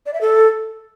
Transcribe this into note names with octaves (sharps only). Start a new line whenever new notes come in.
D5
E5
A4